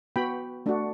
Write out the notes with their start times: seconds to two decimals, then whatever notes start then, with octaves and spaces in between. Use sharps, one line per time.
0.16 B3 F#4 G5 B5
0.66 A3 D4 F#4